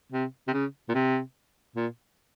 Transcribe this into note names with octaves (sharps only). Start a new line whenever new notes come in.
C3
C3
C#3
A#2
C3
A#2